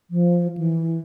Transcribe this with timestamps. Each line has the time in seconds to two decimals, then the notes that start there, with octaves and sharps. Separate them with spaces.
0.11 F3
0.58 E3